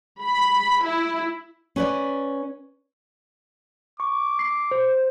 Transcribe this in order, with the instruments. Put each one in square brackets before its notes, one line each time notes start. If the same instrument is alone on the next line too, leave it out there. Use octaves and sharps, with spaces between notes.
[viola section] B5
E4
[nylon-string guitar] C#4 B4 D5
[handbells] C#6 [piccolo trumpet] D6
[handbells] C7
C5